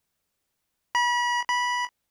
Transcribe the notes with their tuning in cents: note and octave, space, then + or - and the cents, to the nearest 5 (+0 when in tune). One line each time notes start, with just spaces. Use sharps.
B5 -35
B5 -15